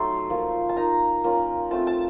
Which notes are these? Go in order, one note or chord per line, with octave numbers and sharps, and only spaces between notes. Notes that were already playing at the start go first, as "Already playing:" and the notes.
Already playing: F#3 A3 D#4 C6
F3 A#3 F4
A5
A#3 D#4 A#5
A#3 C#4 F4
A3 C4 F4 A5
A5